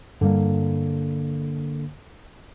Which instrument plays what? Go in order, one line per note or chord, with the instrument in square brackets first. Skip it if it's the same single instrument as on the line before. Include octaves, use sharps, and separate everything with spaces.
[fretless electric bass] G2 G3 D4 [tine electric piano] D3 A#3